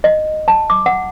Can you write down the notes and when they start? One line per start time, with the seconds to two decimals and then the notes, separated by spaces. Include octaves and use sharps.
0.04 D#5
0.48 A5
0.70 D6
0.86 F#5